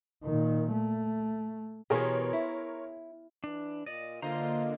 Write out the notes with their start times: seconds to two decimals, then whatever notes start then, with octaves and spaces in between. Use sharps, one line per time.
0.24 A#2 D#3
0.72 A3
1.90 B2 E3 G4 G#4 A#4 C#5 C6
2.33 E4
3.44 E3 D4
3.86 A#2 D5 D#5
4.22 D3 A#3 F4 C5 D#5 A#5